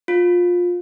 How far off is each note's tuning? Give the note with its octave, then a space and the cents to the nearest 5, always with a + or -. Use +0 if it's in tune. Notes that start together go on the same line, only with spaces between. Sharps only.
F4 +20